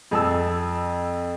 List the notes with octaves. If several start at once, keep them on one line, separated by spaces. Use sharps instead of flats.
F2 A5 E6